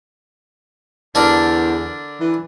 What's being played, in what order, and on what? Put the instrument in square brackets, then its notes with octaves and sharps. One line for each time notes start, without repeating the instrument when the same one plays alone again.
[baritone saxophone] E2 [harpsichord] D3 D4 A#4
[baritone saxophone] E3